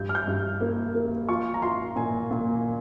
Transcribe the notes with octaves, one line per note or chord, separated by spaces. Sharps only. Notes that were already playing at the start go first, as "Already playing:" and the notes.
Already playing: G2 G6
F6
G6
G2
A#3
A#3
F4 C#6
A#5
F4 C6
A#2 G#5
A#2